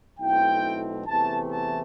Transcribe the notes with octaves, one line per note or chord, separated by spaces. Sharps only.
B1 B2 A3 C4 E4 G5
E2 C3 E3 A3 A5
A5